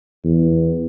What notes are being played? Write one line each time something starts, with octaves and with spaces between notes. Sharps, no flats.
E2